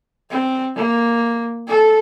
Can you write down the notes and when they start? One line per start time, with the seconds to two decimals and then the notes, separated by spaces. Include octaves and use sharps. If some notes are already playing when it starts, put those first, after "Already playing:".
0.30 C4
0.76 A#3
1.67 A4